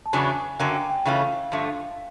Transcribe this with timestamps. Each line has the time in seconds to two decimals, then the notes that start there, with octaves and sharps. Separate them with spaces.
0.06 A5
0.13 E2 C#3 F#3 B3 D4 G#5
0.59 F#2 D3 F#3 A#3 G5
0.74 G5
0.90 G5
1.05 C#3 E3 A3 C#4 F4 F5
1.52 G2 D3 F3 A3